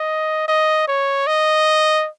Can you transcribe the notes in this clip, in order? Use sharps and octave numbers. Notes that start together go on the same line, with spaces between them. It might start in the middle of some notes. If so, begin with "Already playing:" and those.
Already playing: D#5
D#5
C#5
D#5